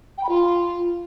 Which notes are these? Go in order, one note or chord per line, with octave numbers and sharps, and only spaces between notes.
G5
B5
F4